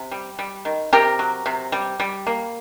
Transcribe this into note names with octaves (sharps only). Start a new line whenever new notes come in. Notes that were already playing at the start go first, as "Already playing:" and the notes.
Already playing: C3
G3
G3
D#3
C3 G4 A#4
F#3
C3
G3
G3
A#3